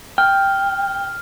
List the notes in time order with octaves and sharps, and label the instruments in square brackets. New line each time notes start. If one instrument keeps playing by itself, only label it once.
[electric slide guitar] G5 [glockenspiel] F6